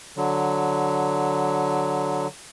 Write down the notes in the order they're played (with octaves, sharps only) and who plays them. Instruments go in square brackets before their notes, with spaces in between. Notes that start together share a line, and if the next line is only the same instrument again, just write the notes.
[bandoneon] D3 F#3